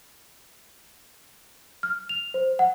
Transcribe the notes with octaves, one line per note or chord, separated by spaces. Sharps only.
F6
F7
C5
F#5